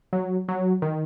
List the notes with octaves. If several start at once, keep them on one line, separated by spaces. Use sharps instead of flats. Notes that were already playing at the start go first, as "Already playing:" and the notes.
F#3
F#3
D#3